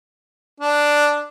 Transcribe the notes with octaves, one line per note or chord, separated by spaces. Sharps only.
D4